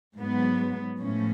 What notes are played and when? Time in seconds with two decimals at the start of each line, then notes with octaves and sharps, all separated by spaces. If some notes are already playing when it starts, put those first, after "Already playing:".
0.17 G#2 F#3 B3
1.00 A2 F3 C#4